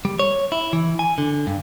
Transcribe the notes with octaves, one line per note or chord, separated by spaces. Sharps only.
G3
C#5
E4
E3
G#5
D3
G2